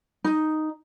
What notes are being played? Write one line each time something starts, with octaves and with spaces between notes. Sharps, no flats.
D#4